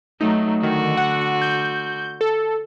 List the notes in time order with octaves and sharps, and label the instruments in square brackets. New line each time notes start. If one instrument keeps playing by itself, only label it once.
[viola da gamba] F#3 A3 [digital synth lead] D#4
[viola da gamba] D3 F#4 [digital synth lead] D#3
[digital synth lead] F#5
G6
A4